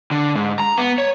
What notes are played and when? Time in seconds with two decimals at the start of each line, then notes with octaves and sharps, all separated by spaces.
0.11 D3
0.36 G#2
0.60 A#5
0.78 B3
0.98 C#5